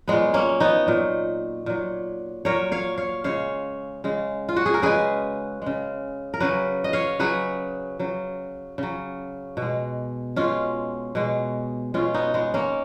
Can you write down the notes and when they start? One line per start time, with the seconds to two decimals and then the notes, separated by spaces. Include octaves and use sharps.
0.08 A#2 F#3 G#3 B3
0.34 A#3 C#4
0.60 B3 D#4
0.87 A#2 F#3
1.66 A#2 F#3
2.45 A#2 F#3 A#4 C#5
2.72 C#5 F5
2.98 C#5 F5
3.24 C#3 G#3 C#5 F5
4.04 C#3 G#3
4.49 F4
4.56 F#4
4.66 G#4
4.74 A#4
4.82 C#3 G#3 G#4 B4
5.62 C#3 G#3
6.34 A#4
6.40 C#3 F#3 G#4 B4
6.84 D#5
6.93 C#5 F5
7.19 C#3 F#3 G#4 B4
8.00 C#3 F#3
8.78 C#3 F#3
9.57 B2
9.62 G#3
10.36 B2 G#3 C#4 F4
11.15 B2 G#3
11.94 B2 G#3 C#4 F4
12.14 B3 D#4
12.34 G#3 B3
12.54 A#3 C#4